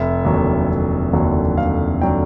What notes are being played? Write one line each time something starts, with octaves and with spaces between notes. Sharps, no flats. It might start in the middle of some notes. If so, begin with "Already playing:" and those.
Already playing: F1 E5
D#2 D3 F#3
F1
D#2 D3 F#3
F1 F5
D3 F#3 G5